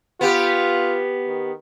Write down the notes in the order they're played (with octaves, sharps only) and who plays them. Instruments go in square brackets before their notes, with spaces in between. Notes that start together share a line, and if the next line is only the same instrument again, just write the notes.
[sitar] B3 G4 [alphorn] F4
[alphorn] D#3